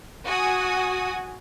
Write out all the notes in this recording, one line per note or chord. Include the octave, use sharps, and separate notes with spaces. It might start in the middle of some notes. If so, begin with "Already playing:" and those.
F#4 G#5 D#6